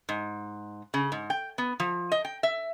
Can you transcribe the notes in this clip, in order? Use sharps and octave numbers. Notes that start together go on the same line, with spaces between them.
G#2
C#3
G#2
G5
B3
F3
D#5
G5
E5